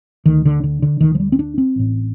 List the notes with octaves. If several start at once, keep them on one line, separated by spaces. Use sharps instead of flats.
D2 D3 D#3
D3
D3
D3
D2 D3 D#3
F3
G3
C4
D4
C4
A1 A2